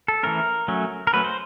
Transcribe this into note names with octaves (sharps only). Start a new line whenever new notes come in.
A4
E3 A3 C#4 A#4
F#3 A3 C#4
A#4
F#3 A3 C#4 B4
C5